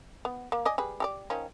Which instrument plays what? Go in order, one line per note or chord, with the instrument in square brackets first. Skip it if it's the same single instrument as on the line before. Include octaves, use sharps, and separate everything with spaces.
[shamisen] B3
A#3
D5 D#5 G#5
G3 G#4 B4
G4 A4 D5
D#3 F3 C#4